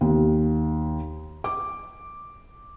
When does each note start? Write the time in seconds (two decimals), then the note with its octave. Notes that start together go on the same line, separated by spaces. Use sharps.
0.01 D#2
1.44 D6